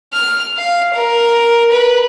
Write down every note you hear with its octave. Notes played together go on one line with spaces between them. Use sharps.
F6
F5
A#4
B4